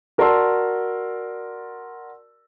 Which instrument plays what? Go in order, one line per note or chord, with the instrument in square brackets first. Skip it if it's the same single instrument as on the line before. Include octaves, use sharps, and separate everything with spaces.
[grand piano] F#4 A#4 D5 A5 C6 E6